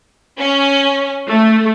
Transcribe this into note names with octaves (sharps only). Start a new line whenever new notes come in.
C#4
A3